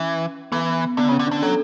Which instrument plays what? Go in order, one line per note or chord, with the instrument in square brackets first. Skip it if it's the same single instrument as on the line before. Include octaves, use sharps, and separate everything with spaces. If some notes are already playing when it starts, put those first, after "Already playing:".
Already playing: [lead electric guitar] E3 [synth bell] C#4
[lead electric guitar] E3 [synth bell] B3
[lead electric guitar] D3 [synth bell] B3
[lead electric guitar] C#3
[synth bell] C#4
[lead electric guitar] D3
[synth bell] D4
[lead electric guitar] D3
[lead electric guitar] F#3 [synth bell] A4